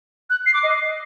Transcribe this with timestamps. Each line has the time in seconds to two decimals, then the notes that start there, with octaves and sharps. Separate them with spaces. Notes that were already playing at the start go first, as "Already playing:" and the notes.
0.30 F#6
0.46 C7
0.54 D6
0.63 D#5